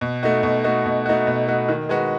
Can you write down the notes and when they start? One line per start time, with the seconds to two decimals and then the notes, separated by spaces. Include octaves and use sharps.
0.01 B2
0.23 A3 D#4 F#4
0.43 B2
0.64 A3 D#4 F#4
0.86 B2
1.06 A3 D#4 F#4
1.27 B2
1.48 A3 D#4 F#4
1.69 D#3
1.89 G#3 D#4 F#4 B4